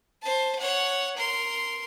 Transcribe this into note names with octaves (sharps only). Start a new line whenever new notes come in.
C5 A5
C#5 F#5
A#4 C6